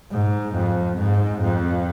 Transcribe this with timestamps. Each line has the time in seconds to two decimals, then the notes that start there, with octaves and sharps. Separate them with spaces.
0.11 G#2
0.54 F2
0.98 G#2
1.42 F2